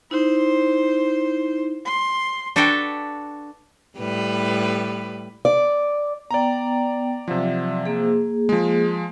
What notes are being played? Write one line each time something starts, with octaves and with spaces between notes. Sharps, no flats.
D#4 E4 C5
C6
D4 F#4 A4 B4 G5
A2 G3 B4
D5
B3 D5 G5 A#5
C3 F3 F#3 D5 E5
A#3 G#4
F3 G#3